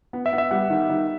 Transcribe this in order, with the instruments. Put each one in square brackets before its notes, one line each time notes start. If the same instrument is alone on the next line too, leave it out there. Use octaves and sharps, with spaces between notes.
[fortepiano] B3
[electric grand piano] E5
[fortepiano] B3
[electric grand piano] E5
[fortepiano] G3 [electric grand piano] F#5
[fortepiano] D#3
D#3